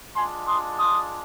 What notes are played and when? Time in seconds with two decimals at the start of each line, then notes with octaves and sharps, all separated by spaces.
0.14 G#3 D4 F4 G#5 C6
0.46 C6 D#6
0.78 C6 D#6